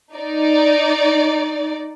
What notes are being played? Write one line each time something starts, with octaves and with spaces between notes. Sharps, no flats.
D#4 D5